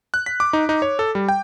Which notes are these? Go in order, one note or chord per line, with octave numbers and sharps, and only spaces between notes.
F#6
B6
D6
D#4
D#4
C#5
A4
G3
G5